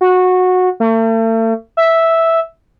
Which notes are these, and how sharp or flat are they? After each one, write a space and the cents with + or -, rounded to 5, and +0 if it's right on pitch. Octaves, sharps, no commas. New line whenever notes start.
F#4 -15
A3 +40
E5 -5